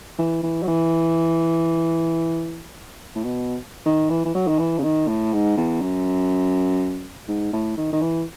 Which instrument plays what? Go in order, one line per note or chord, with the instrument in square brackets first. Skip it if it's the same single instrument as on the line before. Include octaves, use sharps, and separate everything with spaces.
[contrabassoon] E3
E3
F#3
E3
A2
B2
D#3
E3
E3
F#3
D#3
E3
C#3
D#3
A2
G#2
E2
F#2
G#2
A2
D#3
D#3
E3